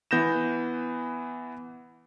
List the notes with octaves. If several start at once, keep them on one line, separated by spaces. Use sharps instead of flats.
E3 B3 G6 A#6 E7